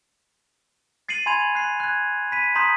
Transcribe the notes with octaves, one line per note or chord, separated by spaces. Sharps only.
A6 C7 C#7 D#7 F#7
G#5 B5 C6 G#6 D#7 F7
F#6 C7
F#6 G#6
B5 B6 D#7
A#5 C6 D#6 G6 B6